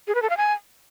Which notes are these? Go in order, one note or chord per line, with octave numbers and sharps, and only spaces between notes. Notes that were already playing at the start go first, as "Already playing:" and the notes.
G#4
B4
A4
F5
G#5